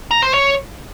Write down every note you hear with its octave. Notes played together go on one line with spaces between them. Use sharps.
A#5
C5
C#5